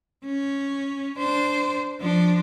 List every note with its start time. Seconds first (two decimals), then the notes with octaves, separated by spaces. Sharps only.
0.25 C#4
1.18 D4 C5
2.00 F3 D4